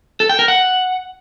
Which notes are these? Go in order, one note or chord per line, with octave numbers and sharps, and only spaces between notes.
A4
G5
A#4
F#5